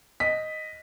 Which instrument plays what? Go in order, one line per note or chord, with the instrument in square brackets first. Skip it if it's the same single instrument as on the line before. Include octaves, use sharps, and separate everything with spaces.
[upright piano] D#5 B6